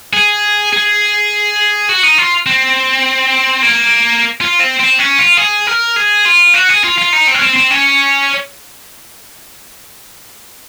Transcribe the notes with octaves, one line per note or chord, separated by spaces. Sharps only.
G#4
G#4
F#4
D#4
F4
C4
A#3
F4
C4
C4
C#4
F4
G#4
A#4
G#4
F4
F#4
G#4
F4
F4
D#4
C4
C#4
C4
C4
C#4